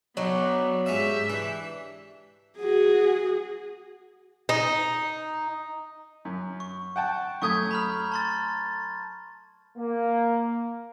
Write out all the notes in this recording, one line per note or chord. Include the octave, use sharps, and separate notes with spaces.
B1 F#3 B3 D4 D#4
G#2 C#4 G4 E5 F5
E3 D4
F#4 G#4
D#4
F#2
C#6
F#5 G5 A5
F#2 A3 C#6 D#6 G6 G#6
A#5 B5 F6
A5 C6 A6
A#3